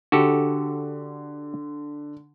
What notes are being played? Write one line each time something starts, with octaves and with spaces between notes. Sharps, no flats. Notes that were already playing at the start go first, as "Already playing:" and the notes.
D3 F#4 G4 A4